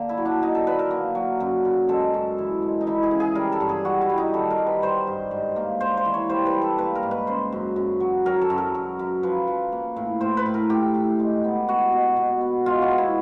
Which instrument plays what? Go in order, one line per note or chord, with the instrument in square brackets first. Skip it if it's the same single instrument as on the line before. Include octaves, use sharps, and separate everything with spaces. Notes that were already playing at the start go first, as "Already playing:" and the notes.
Already playing: [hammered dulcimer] D3 A#3
E4
F#3
D4
D3 D#4
A4
D3 B4
A#4
A#3
F#3
F#2
C#3
G#3 A4
F#2
E3
G#3
D#4
E3 E4
G#4
C#3
G#4
G3 A#4
A4
G2
G#4
G3 F#4
E4
G3
D#4
D#3 A4
A#4
G3
B4
G3 C5
G2
G#2
A#3
A#3 C5
C5
E3
C#5
G3 C5
B4
G3
A4
A#3 B4
A#4
G#2
B4
C#3 C5
F#2
F#2
F#3
F#3 A#4
A4
F#2
A#4
F#2
F#2
F3 B4
F3
A#3
A2
A2 C5
B4
A2
A#4
A2 G4
A2
G#3
B3
B3 F#4
B2
B2
B3
G#3 F4
F#4
B3
E4